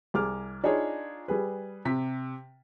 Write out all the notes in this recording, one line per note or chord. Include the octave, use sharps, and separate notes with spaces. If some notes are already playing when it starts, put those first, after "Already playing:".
C2 G#4 D6 F6
D4 D#4 F4 G#4 C#5
G3 G#4 B4
C3 B6